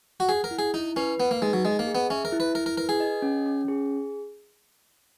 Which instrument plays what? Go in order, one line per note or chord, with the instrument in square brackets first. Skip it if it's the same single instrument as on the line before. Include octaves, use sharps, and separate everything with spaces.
[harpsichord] F#4
[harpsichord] G#4 [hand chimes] F#5
[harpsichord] A#4
[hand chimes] E4
[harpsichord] G#4
[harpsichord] D#4 [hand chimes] E4
[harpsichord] C#4 [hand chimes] B4
[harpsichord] B3 [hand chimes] B4
[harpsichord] A#3
[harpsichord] G#3 [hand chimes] D#4
[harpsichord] F#3
[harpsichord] G#3 [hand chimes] D#5
[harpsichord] A#3
[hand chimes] G#4
[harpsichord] B3
[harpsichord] C#4 [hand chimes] E5
[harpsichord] A#4
[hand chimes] E4
[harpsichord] B4
[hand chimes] E4 [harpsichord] A#4
[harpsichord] A#4
[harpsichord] A#4 [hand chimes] B4
[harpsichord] G#4
[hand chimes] D#5
C#4
C#4
G#4